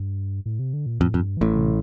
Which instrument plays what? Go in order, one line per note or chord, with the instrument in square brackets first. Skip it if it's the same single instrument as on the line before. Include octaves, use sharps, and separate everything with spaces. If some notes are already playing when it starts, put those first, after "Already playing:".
Already playing: [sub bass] G2
A2
C3
D3
A#2
[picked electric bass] F2 [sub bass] A2
[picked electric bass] F2
[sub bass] G2
[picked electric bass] A1 A2 [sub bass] E3
[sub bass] C3